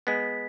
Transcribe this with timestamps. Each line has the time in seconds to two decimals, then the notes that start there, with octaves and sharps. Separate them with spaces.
0.07 G#3 B3 B6